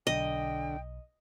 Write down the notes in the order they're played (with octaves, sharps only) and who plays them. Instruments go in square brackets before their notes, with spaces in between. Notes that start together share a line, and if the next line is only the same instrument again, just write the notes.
[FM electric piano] B1 [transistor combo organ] D3 [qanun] D#5 [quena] G5